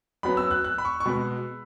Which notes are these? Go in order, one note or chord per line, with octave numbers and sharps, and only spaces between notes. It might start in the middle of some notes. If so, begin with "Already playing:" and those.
F#2 F#3 B3 B5
E6
F#6
F#6
B5
C#6
C#6
B2 G#3 B3 B5